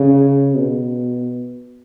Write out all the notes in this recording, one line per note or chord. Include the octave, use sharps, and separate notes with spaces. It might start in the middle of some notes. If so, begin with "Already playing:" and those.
Already playing: C#3
B2